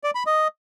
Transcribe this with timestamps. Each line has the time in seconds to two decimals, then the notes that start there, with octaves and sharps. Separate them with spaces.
0.04 D5
0.15 B5
0.26 D#5